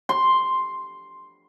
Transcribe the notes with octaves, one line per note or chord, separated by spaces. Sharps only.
C6